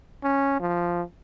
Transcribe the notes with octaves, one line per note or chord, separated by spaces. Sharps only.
C#4
F3